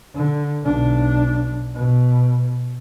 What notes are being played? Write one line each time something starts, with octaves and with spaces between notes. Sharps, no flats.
D3
B1 D4
B2